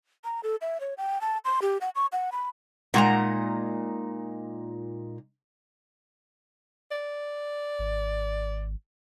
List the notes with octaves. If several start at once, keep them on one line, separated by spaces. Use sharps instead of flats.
A#5
A4
E5
C#5
G5
A5
C6
G4
F#5
C#6
F#5
B5
A#2 G#3 D#4 F#4 F#5 A#5
D5
G#1